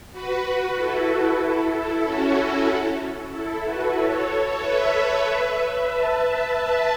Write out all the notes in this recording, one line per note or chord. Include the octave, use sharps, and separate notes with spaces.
F#4 B4
E4 A4
F#4 B4
E4 A4
C#4 F#4
E4 A4
F#4 B4
A4 C#5
A4 C#5
B4 E5
E5 A5